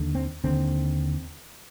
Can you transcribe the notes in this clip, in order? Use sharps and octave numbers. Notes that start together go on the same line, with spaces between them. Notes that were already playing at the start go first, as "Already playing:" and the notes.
Already playing: D#2 D3
C4
D#2 D3 C4